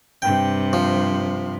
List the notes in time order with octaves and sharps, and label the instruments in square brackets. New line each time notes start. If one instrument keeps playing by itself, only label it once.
[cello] G2 C3 [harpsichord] G5
[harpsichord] F3